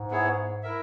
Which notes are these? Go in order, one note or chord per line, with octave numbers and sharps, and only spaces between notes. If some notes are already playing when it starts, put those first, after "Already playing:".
Already playing: G#2
B3 E4 G#4 C#5
E4 A#4 E5